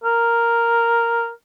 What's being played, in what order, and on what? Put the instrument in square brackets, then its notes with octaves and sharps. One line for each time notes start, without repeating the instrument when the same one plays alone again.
[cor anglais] A#4